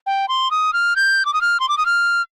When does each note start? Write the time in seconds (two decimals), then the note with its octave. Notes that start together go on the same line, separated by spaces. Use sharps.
0.06 G5
0.28 C6
0.51 D#6
0.73 F6
0.96 G6
1.25 D6
1.33 D#6
1.41 F6
1.60 C6
1.69 D6
1.78 D#6
1.86 F6